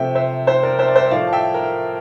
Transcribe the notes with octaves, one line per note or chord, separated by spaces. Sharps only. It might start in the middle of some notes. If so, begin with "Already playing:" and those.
Already playing: C3 F3 A3 E5 G5
C5 E5
C5 E5
A#4 D5
C5 E5
D5
C5 E5
E5
A2 F3 A3 D5 F5
A5
E5 G5
A#4